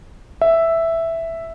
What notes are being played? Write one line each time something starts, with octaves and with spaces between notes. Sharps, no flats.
E5